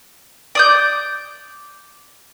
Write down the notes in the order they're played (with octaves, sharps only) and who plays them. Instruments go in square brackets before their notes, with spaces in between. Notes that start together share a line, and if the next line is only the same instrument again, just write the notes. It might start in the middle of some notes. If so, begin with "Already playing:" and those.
[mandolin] D5 D#6 G6